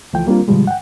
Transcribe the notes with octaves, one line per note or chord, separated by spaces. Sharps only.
C#2 E3 F3 A3 G5
G3 A#3 C4 D4 F4 A#4
G2 B2 D3 F3 G3 G#3
F#5 G5